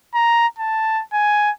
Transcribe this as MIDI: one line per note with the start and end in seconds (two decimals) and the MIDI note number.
0.14 0.47 82
0.58 1.02 81
1.13 1.51 80